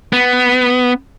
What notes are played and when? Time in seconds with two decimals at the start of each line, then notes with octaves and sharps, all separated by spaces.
0.13 B3